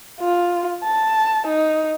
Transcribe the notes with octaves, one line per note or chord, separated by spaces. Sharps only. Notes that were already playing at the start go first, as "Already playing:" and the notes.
F4
A5
D#4